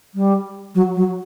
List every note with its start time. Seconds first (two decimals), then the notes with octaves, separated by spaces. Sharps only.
0.15 G3
0.75 F#3
0.96 F#3